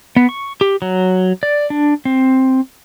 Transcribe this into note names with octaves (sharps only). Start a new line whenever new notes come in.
B3
C#6
G4
F#3
D5
D4
C4